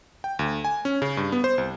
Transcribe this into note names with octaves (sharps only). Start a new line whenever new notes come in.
G5
D2
G#5
C#4
C#3
G2
B3
C5
C2